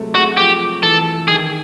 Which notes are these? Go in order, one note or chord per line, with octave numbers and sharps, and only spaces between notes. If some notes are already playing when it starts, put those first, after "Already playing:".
Already playing: C3 F#3 G#3 A3
G#3 F#4
F3 G4
E3 A4
D#3 G#4